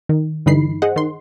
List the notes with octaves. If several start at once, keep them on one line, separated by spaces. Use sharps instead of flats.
D#3
G2 D3 E3 D#4 B5 C7
G#4 C5 D#5 F#5
D#3 C6